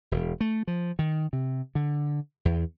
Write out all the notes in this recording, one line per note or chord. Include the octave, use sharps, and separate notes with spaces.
E1
A3
F3
D#3
C3
D3
E2